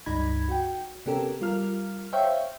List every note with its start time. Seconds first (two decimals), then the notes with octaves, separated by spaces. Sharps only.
0.06 C#2 G2 D#4 B5 G#6
0.49 F#4 G5
1.06 C3 B3 C#4 G4 A4 A#4
1.41 G3 F4 A#4 F6
2.13 C5 C#5 E5 F5 G5 C#6